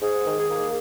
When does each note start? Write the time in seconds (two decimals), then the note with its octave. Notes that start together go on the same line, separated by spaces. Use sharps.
0.02 G#2 G#4
0.26 D#3
0.38 G#4
0.50 A#3